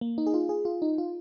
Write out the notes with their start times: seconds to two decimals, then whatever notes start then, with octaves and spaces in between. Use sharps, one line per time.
0.01 A#3
0.18 D#4
0.27 G#4
0.34 F4
0.49 G#4
0.65 F4
0.82 D#4
0.98 F4